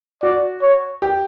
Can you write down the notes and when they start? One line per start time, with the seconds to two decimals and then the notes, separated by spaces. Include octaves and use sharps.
0.23 F#4 D5
0.62 C#5
1.02 G4